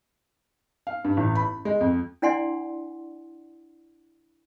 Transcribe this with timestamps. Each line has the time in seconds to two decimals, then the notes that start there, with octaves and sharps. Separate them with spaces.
0.87 F5
1.04 G2
1.17 A1
1.35 B5
1.65 G#3
1.81 F2
2.22 D4 E4 D5 F#5 G#5 C6